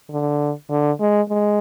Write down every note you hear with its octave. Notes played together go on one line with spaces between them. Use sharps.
D3
D3
G#3
G#3